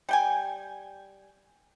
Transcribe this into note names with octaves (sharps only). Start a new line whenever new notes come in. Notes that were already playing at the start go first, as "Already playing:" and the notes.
G3 G5 G#5